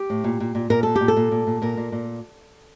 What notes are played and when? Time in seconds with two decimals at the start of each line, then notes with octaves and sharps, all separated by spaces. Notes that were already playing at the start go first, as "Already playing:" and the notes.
Already playing: G4
0.10 A2
0.24 A#2
0.40 A#2
0.55 A#2
0.70 A#2 A#4
0.83 A#2 A4
0.96 G4
1.01 A#2
1.08 A4
1.17 A#2
1.32 A#2
1.47 A#2
1.62 A#2 A#4
1.77 A#2
1.92 A#2